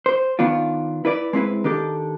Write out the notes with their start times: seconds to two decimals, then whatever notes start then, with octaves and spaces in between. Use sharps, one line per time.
0.06 C5
0.39 D#3 B3 D4 F4
1.05 E4 B4 D5
1.33 G#3 C4 E4 B4
1.64 D#3 D4 G4 A4